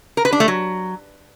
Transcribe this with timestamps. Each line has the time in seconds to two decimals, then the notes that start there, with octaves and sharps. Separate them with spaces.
0.17 A#4
0.25 B4
0.32 D4
0.40 A3
0.48 F#3